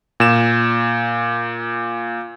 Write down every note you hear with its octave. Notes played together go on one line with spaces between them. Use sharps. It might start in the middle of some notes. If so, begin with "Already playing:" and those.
A#2 E7